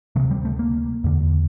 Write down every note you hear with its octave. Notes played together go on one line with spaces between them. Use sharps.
D2 C3 F3
G3
A3
A#3
E2 D3